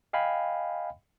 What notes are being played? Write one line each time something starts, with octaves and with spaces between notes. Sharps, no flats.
D#5 F5 G5 G#5 B5